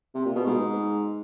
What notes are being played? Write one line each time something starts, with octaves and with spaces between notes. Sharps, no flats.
C3
A#2
B2
G#2